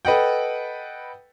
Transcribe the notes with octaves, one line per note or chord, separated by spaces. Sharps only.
A4 B4 D#5 F#5 G5